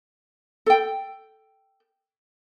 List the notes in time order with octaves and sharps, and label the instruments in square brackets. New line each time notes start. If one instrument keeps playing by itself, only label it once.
[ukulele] A4 G5